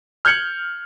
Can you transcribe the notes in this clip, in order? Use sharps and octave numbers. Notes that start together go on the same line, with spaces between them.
F6 G6 G#6 C#7 F#7